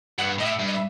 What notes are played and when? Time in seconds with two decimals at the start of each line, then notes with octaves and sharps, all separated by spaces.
0.18 G2 F#5
0.39 A2 D#5
0.45 E5
0.60 G2
0.68 D#5
0.74 E5